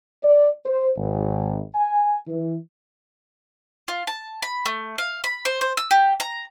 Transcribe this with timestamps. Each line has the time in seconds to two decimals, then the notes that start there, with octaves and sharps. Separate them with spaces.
0.23 D5
0.65 C5
0.97 G#1
1.75 G#5
2.27 E3
3.88 F4
4.07 A5
4.42 B5
4.66 A3
4.98 F5
5.24 B5
5.45 C5
5.61 C5
5.77 E6
5.91 G4
6.20 A#5